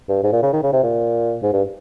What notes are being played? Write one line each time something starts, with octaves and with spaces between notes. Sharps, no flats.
G2
G#2
A#2
C#3
D#3
C#3
C3
A#2
G#2
G2